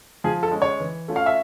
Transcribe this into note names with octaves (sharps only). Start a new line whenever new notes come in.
F3 G#4
A4
G#3 C#4
C#5
E3
A3 C#4 F4
F5
E5